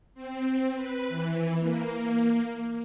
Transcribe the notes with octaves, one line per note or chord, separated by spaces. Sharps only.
C4
B4
E3
A#3